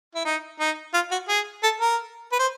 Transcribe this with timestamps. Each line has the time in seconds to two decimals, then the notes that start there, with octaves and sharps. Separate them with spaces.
0.15 E4
0.25 D#4
0.60 D#4
0.94 F4
1.12 F#4
1.29 G#4
1.63 A4
1.80 A#4
2.32 B4
2.39 C5